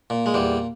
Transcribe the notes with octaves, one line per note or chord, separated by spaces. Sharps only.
A#2
G#3
E2 G3